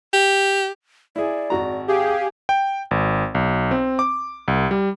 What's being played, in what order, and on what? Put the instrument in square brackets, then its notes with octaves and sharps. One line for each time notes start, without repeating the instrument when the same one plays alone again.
[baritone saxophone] G4
[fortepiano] E4 G#4 [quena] D5
[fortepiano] G#1 F#4 A#5
[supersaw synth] G4 G#4 [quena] F5
[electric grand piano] G5
G#1
B1
C4
D6
C2
G3